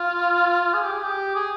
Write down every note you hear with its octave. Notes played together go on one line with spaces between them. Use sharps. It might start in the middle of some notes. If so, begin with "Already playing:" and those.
Already playing: F4
G#4
G4
G#4
G4
G#4